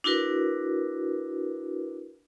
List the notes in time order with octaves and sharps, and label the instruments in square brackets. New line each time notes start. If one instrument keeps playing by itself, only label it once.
[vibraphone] D4 E4 F#4 A#4 B4